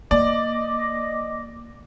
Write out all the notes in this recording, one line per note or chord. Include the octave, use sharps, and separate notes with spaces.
A#3 D5 D#5 D6